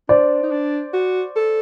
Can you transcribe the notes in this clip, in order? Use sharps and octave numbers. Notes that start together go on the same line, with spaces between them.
D4 C5 D5
D#4
D4
F#4
A4